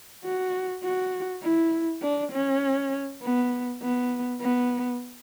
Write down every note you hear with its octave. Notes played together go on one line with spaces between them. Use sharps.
F#4
F#4
E4
D4
C#4
B3
B3
B3